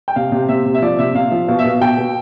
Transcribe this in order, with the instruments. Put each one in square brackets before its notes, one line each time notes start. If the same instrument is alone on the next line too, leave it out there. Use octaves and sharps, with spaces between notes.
[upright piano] G5
C3 F5
C3
C3 E5
C3
E5
F3 D5
C3 E5
C3 F5
F3
B2 F5
E5
B2 F5
B2 G5
B2